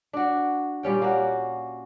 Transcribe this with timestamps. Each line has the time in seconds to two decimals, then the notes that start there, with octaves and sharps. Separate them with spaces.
0.13 D4 F#4
0.83 A#2 G3 C#4 G5
1.02 A#3 F#4